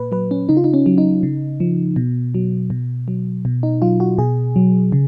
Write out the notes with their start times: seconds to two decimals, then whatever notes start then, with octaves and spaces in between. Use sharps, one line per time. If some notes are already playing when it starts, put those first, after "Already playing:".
Already playing: A#2 B4
0.12 F#3 B4
0.31 C#4
0.49 C#3 D#4
0.57 F4
0.64 D#4
0.74 C#4
0.86 F#3
0.98 D#4
1.23 C#3
1.60 F3
1.96 B2
2.34 F#3
2.70 B2
3.08 F#3
3.45 B2
3.63 D#4
3.82 F#3 F4
4.00 F#4
4.18 B2 G#4
4.56 F#3
4.92 C#3